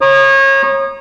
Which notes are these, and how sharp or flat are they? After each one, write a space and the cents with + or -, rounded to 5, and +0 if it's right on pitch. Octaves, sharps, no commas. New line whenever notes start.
C#5 -30 A#5 +25 D#6 -25